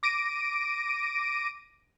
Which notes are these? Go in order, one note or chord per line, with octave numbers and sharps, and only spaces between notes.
D6 A#6 D7 D#7